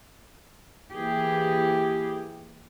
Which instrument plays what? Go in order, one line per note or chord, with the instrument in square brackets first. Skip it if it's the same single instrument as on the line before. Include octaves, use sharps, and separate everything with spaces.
[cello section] E3 A#3 G4 G#4